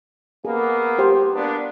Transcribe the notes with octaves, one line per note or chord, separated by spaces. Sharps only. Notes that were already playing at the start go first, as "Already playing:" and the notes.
A#3 B3 G#4
G4 C5
A#3 B3 D4